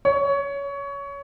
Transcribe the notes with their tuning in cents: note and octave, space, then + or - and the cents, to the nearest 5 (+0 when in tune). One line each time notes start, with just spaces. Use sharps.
C#5 +20